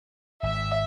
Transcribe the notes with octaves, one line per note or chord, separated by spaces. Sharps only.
G#1 G#2 E5